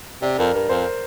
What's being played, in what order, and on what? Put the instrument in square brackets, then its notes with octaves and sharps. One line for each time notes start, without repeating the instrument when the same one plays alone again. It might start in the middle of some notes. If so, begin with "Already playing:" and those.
[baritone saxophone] C3 [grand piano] D5
[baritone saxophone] F2 [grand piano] A#4
[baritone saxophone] G2 [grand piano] A#4
[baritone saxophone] F2 [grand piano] C5